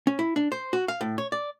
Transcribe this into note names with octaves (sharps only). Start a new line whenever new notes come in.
C#4
E4
D4
C5
F#4
F5
A2
C#5
D5